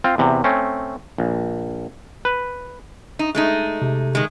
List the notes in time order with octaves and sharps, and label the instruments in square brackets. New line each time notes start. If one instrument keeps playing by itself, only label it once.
[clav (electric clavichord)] C4 F4
E2 C3
A3 C4 C#4
A#1
B4
[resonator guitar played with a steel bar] D#4
G#3 A3 D#4
[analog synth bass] C3
[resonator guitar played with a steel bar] D#3 G#3